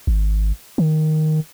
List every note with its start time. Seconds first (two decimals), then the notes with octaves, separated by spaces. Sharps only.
0.07 G#1
0.78 D#3